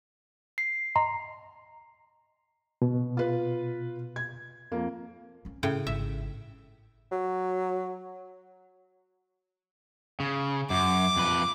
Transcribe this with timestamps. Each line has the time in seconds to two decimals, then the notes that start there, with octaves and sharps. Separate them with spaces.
0.58 C7
0.96 D#5 A#5 C6
2.82 B2
3.17 F4 B4
4.16 G#6
4.71 F2 A#3
5.45 C4 C#4
5.63 A2 C#3 G5
5.87 G#1 E5
7.11 F#3
10.20 C#3
10.70 F#2 D6
11.16 F2 B4